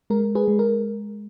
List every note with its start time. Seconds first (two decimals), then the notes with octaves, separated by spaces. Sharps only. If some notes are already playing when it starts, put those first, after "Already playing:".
0.10 G#3 A#4
0.35 G#4 B4
0.48 G#3
0.59 A#4